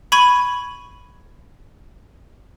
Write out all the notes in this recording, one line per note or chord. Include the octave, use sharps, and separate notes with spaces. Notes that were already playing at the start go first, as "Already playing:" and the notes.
B5 C#6 G#6 D#7 F#7